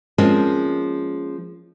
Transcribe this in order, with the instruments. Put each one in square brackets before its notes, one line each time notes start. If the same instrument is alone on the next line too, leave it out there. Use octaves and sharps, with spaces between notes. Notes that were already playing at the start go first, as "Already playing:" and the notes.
[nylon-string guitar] F3 G#3 A#3 C4 C#4